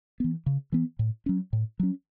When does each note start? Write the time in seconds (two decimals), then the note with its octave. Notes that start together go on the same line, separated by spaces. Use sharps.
0.20 E3 B3
0.46 C#3
0.72 E3 B3
0.99 A2
1.26 F#3 C#4
1.53 A2
1.80 F#3 C#4